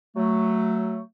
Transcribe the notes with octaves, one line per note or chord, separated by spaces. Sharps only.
F#3 A3